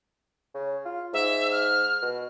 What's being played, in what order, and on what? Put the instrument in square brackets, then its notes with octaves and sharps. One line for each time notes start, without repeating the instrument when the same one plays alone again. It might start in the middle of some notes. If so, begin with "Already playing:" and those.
[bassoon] C#3
F4
[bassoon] G#2 [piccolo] E5
[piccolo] F6
[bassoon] B2